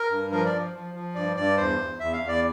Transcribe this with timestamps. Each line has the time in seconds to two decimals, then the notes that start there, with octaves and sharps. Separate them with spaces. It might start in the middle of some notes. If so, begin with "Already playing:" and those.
Already playing: A#4
0.10 G2
0.31 F3 A#4
0.45 D5
0.52 F3
0.73 F3
0.94 F3
1.15 G2 D5
1.36 G2 D5
1.57 E2 C5
1.78 E2
1.99 E2 E5
2.13 F5
2.20 E2
2.28 D5